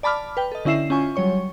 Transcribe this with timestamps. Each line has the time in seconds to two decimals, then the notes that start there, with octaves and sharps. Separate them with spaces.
0.03 D5 A5 B5 D6 F6
0.37 B4 G5
0.52 A4 D#5
0.65 D3 C#4 E4 E5 C7 E7
0.90 C#4 F4 G#5 C#6
1.16 F#3 G3 C#5 C#6